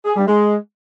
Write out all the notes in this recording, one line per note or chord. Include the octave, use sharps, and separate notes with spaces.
G#4
G3
G#3